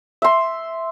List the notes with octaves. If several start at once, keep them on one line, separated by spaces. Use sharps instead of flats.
E5 C6